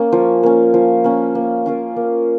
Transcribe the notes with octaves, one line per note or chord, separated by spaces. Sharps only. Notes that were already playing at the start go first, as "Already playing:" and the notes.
Already playing: A#3 C#4
F3
A#3 C#4
F3
A#3 C#4
A#3
C#4 F4 A#4
A#3